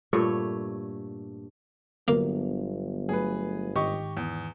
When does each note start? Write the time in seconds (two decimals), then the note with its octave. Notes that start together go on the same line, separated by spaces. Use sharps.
0.13 G2 A#2 A3 C#5
2.08 G1 D3 F#3 A#3 B3
3.09 F#3 A3 G#4 B4
3.76 G#2 D#3 G4 D#5 C#6
4.17 E2